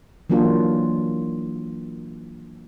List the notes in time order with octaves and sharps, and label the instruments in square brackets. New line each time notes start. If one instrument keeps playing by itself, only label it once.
[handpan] E3 F#3 A#3 D4 F4